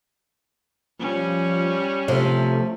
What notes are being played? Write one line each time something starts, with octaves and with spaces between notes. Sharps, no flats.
F3 G3 C#4
C3 F3 A3